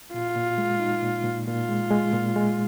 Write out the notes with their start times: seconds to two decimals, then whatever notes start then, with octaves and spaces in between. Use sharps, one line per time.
0.13 A#2 F4
0.36 A#2
0.58 G#3
0.80 D#4
1.02 A#2
1.24 A#2
1.47 A#2 F4
1.69 G#3
1.91 G#3
2.13 A#2
2.36 G#3